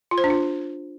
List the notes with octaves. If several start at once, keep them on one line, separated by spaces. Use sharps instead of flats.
F4
C5
D4
F4